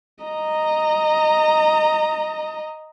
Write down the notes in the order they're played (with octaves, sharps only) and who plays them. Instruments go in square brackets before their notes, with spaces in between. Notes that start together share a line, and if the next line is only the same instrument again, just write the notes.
[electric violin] D#5 A#5